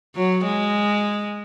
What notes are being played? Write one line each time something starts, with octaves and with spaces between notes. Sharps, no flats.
F#3
G#3